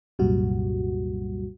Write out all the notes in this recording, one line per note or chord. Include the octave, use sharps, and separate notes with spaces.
C2 F#2 A#2 G3 F#4